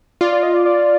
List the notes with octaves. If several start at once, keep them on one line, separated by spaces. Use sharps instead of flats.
F4 D5
D5
D#5
D5
D5